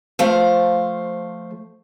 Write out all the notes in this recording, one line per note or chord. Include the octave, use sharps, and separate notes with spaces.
F3 A3 C5 F5